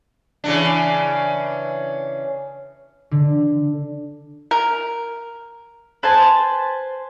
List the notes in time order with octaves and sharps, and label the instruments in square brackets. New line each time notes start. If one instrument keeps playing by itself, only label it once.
[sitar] C#3 E3 D4
[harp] D3
[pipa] A#4
[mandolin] B4 C5 G#5 A5